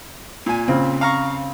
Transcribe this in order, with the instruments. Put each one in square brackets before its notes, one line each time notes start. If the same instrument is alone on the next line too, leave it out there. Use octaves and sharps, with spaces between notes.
[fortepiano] A#2 G#5
[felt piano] C#3 C4
[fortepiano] F5 A#5 C#6